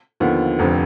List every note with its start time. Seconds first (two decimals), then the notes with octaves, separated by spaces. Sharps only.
0.20 D#2 D3 F3 B3
0.59 F1 F2 D3 F3 C4